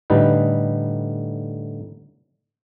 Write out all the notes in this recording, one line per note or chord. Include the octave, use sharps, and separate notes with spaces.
A2 D3 G3 D#4 B4